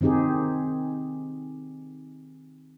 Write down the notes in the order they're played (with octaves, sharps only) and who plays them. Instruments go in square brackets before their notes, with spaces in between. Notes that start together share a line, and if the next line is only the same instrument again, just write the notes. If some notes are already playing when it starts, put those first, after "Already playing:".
[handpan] D#3 C4 D#4 G4 G#4